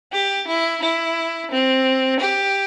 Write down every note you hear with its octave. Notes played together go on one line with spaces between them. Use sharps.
G4
E4
E4
C4
G4